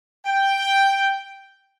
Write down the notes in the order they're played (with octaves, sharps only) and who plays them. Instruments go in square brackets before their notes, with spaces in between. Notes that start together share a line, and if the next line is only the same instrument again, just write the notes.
[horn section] G5